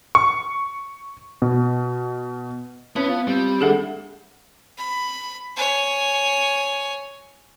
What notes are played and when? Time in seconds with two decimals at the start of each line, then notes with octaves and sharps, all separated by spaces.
0.15 C#6
1.42 B2
2.96 B3 C#4 E4 B4 A5
3.09 F4
3.28 G3 C4
3.61 D#2 D4 G#4 A4 E5 F#5
4.78 B5
5.56 C#5 G#5